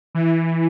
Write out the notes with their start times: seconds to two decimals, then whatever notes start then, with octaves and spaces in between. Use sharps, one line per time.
0.15 E3